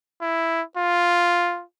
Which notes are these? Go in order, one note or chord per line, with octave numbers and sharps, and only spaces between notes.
E4
F4